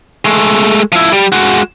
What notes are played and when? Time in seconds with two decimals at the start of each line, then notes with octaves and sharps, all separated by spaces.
0.25 G#3 A3
0.92 F3 E4
1.12 G3
1.32 G#3 F#4